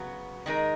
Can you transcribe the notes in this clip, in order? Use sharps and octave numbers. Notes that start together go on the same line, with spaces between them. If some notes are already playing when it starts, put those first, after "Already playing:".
Already playing: C#3 F#3 B3 F#4
D#3 G#3 D#4 A#4